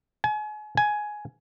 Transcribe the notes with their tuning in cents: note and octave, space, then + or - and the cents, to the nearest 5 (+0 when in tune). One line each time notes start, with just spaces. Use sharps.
G#5 +35
G#5 +10